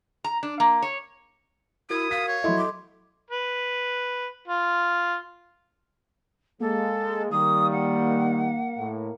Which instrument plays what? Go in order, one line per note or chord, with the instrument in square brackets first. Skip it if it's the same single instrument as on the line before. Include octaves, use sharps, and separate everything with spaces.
[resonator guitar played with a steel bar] A#5
D4
A#3
C#5
[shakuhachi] E4 [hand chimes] F#4 A#4 G#6 [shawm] D#6
[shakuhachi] F5 [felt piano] B6
[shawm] C#5
[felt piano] F#3 E4 [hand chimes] A4 D#5 C6
[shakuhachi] D6
[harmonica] B4
F4
[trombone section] G#3 [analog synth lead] A#3 [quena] A4
[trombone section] D#3 G3 [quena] D#6
[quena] F#5
[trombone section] A2